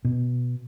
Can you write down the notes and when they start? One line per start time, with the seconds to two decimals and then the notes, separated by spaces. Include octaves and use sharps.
0.05 B2